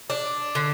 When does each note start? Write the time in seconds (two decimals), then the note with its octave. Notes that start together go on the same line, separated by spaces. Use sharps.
0.10 D4
0.55 D3